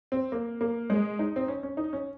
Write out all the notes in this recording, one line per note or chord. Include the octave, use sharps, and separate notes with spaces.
C4
A#3
A#3
G#3
D#4
C4
C#4
C#4
D#4
C#4